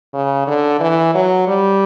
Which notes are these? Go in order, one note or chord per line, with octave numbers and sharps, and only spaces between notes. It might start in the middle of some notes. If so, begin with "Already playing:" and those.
C#3
D3
E3
F#3
G3